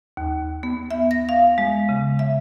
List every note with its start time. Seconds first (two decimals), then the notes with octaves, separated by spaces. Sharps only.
0.17 D#2
0.63 B3
0.91 E5
1.11 A#6
1.29 F5
1.58 G#3
1.89 C#3
2.19 E5